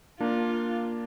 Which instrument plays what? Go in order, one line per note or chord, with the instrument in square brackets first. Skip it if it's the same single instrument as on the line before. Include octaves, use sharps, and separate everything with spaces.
[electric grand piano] A#3 D4 [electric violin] F4